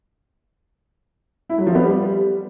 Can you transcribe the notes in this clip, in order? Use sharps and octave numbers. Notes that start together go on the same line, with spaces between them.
E4
F#3
F3
B3
G3